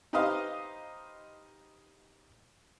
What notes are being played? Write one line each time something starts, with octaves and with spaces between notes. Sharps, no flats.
D#4 G4 B4 C5 D#5 F5